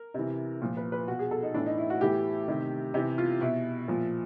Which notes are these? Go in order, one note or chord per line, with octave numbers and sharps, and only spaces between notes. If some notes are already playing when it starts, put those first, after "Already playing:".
Already playing: A#4
C3 E3
A#2 F3
B4
B4
B2 F#4
G#4
A4
D#4
A2 E3 D4
D#4
E4
F#4
A2 E3 G4
C3 D#3
C3 E3 G4
F4
B2 E4
A#2 F3